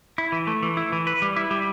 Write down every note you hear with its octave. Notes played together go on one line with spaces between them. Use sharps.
E4
E3
A3
E3
E4
E3
B4
G3
E4
G3